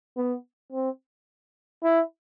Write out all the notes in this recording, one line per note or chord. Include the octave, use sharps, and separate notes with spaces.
B3
C4
E4